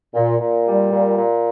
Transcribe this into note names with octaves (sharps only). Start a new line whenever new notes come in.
A#2
A#2
G3
A#2
A#2